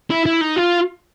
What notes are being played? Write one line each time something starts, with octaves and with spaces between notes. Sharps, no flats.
E4
E4
D#4
F4